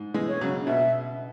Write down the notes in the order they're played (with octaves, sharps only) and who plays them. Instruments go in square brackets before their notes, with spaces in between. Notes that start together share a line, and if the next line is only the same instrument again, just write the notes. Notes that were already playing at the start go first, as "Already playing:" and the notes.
Already playing: [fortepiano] G#2
E3 G#3
[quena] C#5
[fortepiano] C#3 F#3
[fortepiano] B2 [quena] E5